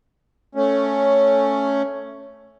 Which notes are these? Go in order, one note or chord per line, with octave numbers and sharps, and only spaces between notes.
A3 C#4